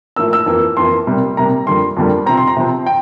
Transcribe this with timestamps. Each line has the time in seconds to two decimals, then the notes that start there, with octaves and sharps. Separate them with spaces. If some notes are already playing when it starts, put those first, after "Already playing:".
0.16 A2 F3 A#3 E6
0.33 E6
0.46 F2 E3 A#3
0.77 F2 E3 A#3 C6
1.07 C3 G3 A#3
1.37 C3 G3 A#3 A#5
1.66 F2 D3 G3 A#3 C6
1.97 F2 D3 G3 A#3
2.26 C3 F3 C4 A#5
2.37 C6
2.47 A#5
2.57 C3 F3 C4
2.86 G5